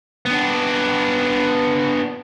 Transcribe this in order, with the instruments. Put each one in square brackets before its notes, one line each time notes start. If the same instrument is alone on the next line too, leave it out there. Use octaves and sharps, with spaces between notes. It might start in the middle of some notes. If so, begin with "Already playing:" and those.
[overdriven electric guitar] B3 D4